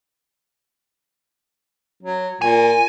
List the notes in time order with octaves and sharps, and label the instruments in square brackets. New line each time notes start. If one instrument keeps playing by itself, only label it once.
[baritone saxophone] F#3
[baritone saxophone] A#2 [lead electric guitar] G#5